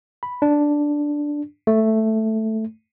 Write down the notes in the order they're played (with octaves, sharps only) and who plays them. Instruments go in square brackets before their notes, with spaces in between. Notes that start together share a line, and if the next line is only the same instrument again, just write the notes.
[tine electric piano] B5
D4
A3